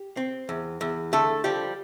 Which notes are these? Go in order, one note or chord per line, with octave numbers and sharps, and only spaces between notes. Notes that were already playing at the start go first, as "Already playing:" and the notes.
Already playing: G4
C4
E2
E2
D3 A3 A4
F3 G3 G4